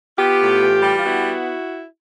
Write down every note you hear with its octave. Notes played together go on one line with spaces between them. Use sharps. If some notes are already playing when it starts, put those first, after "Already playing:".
B3 F4 G4
A2
E3
G3
F4
B3 E4 F#4